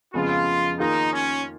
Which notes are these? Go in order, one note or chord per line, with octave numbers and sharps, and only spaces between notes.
F2 C#3 F3 G#3 B3 F4
D#3 A#3 D#4 F4 G#4
C#4